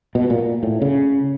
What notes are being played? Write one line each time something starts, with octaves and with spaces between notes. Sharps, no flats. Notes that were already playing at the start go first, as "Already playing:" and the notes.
B2
A#2
A2
C#3